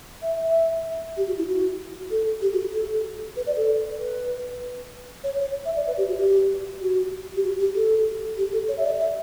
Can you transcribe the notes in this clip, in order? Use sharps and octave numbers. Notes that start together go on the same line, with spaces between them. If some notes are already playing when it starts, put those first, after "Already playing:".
E5
E5
G4
F#4
E4
F#4
A4
G4
F#4
A4
B4
D5
A4
B4
C#5
C#5
E5
D5
B4
G4
F#4
G4
F#4
G4
F#4
G4
A4
G4
A4
C#5
E5
D5
E5